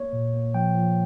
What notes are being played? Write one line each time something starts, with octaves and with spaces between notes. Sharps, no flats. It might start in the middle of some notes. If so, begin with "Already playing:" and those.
Already playing: A#3 C#5
A#2
A#3
F3 G5
F3